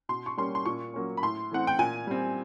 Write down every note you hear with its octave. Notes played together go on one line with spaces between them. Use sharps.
B2 C6
C#6
G3 A#3 C#4 C6
C6
A#2 C#6
F#3 A#3 C#4
B5
A2 C6
E3 A3 C4 F#5
G5
A#2 G#5
G3 C4